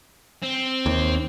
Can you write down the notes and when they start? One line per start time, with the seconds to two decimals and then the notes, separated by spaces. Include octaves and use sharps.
0.42 C4
0.86 D#2